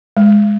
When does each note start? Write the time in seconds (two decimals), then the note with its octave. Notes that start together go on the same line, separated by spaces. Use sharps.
0.17 G#3